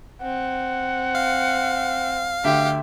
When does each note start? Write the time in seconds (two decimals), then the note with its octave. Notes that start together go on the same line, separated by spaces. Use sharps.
0.22 C4 F#5
1.15 F5
2.44 D2 G4 E5